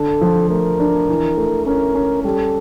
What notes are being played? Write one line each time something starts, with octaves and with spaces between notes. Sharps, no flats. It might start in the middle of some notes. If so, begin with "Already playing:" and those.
Already playing: D3 A4
F3
A3 A#4
D4
E3
A3
C#4 A#4
C#4
G3 A4